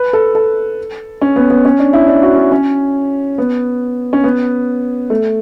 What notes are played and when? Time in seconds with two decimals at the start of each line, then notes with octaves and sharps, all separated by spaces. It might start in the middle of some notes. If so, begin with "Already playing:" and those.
Already playing: B4
0.13 A4
0.35 A4
1.21 C#4
1.36 B3
1.50 B3
1.65 C#4
1.79 D4
1.93 E4
2.08 D4
2.23 F#4
2.36 C#4
2.52 C#4
3.38 B3
4.13 C#4
4.24 B3
5.10 A3